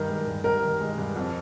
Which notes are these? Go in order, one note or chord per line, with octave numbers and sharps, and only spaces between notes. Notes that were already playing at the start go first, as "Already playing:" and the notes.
Already playing: G2 D#3 A#4
G#3
G2
G2 A#4
D#3
G#3
G2
F2